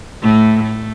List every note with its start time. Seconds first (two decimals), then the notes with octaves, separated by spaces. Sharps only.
0.22 A2 A3
0.64 A3